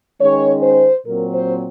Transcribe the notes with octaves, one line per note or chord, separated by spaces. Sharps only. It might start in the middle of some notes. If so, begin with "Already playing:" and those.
D#3 G#3 C#4 C#5
C5
A#2 F#3 C4 A#4
C5